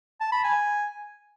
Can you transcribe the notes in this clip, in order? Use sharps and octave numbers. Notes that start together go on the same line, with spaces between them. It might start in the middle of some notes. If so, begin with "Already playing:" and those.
A5
B5
G#5